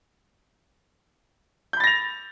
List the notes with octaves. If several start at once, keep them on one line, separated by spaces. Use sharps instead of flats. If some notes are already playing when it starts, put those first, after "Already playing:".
B5 G6 A6 A#6 F7